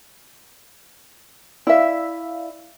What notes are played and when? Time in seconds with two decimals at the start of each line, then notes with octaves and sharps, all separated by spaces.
1.67 E4 D5 E5 F5